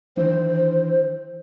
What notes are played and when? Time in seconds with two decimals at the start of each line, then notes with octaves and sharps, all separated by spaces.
0.17 D#3 E3 D4 C5